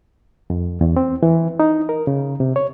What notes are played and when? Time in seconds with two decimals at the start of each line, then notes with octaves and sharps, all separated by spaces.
0.50 F2
0.81 E2
0.97 C4
1.23 E3
1.60 D#4
1.89 A#4
2.07 C#3
2.40 C3
2.56 C#5